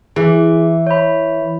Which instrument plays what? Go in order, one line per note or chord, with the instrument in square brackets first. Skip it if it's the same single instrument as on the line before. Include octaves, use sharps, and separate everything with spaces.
[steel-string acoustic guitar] E3 [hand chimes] G#4
[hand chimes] C#5 B5